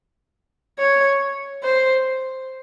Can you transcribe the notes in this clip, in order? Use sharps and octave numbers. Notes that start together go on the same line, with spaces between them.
C#5
C5